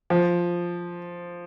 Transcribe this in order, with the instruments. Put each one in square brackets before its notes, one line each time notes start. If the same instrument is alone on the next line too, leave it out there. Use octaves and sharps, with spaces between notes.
[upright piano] F3